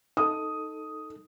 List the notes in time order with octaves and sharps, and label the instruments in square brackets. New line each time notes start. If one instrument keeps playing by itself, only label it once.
[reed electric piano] D#4 A4 [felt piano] D#6